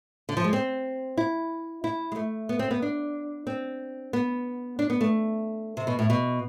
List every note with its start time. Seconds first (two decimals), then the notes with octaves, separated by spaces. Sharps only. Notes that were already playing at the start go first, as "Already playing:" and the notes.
0.29 D3
0.37 F3
0.44 G#3
0.53 C4
1.18 E4
1.84 E4
2.12 G#3
2.16 A3
2.49 B3
2.59 C4
2.71 B3
2.82 D4
3.47 C4
4.13 B3
4.79 D4
4.90 B3
5.01 A3
5.77 C3
5.87 B2
5.99 A2
6.10 B2